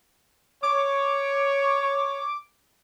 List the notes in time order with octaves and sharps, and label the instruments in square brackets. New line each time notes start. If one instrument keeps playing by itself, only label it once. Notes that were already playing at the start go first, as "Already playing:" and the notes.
[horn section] C#5 [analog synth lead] D6